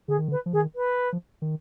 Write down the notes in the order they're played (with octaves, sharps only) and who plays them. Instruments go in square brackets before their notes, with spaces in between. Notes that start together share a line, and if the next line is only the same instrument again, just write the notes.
[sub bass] D3 [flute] G#4
[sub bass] D#3
D3
[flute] B4
[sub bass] F3
[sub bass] D#3 [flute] G#4
[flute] B4
[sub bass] F3
D#3